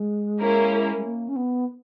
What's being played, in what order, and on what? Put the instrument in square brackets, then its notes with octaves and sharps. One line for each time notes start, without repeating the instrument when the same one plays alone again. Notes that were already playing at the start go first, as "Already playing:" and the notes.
Already playing: [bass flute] G#3
[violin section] A#3 C#4 E4 A#4
[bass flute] G#3
A#3
C#4
B3